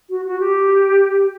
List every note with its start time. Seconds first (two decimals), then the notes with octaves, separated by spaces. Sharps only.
0.09 F#4
0.25 F#4
0.40 G4